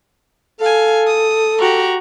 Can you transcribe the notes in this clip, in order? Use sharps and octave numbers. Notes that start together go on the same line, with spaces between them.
A4 F5 G#5
D#6
F#4 G4 A#5